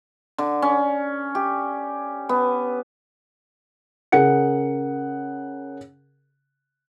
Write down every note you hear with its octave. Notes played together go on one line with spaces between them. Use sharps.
D3
C#4
G4
B3
C#3 G#4 A#4 F#5 C#7